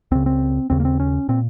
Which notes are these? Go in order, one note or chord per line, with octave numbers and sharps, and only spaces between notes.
C#2 C#3 C4
C4
D#2 C#3 C4
A#3
C4
C#4
A#2 C4